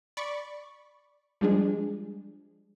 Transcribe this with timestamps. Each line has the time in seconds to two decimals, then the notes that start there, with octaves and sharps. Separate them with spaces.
0.17 D5 B5 C#6
1.41 F3 G3 G#3 D4 G#4